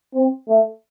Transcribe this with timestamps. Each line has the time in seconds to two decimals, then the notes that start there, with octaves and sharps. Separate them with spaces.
0.14 C4
0.49 A3